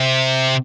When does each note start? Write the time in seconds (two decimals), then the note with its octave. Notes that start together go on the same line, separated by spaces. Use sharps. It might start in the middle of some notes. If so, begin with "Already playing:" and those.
Already playing: C3